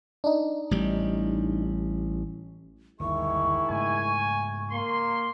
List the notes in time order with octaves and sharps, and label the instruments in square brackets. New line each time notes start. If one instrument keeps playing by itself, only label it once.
[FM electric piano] D4 D#4
[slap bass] A1 G3
[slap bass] G1 D#2 [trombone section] D#3 G#3 E4 [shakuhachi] C#6
[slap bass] G#2 C#3 A3 [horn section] G#5
[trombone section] A#3 [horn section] C6